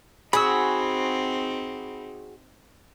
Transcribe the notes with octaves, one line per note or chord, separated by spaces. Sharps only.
C4 D#4 F#4 G#4 B5 E6